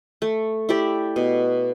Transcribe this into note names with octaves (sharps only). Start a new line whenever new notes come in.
A3
E4 G4 D5
B2